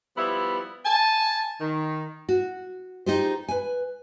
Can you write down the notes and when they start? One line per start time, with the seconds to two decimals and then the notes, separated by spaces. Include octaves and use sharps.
0.18 F3 G3 B3 E4
0.85 G#5 A5
1.61 D#3
2.29 F#4
3.06 D#4 F4 G4 G#4 C5
3.48 B4 G#5